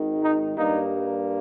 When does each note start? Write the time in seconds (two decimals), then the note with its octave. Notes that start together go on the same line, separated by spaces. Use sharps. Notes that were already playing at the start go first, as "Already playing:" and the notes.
Already playing: G#1 G#2 D#3
0.20 D#4
0.56 G2 G3 A#3 D#4